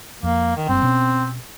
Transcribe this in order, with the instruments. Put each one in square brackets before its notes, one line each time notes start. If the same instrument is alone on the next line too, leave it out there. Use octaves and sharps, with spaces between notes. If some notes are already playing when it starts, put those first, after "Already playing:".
[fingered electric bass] F2 [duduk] A#3
[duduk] D#3
[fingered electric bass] F#1 G2 [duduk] C4
[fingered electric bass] B2 C#4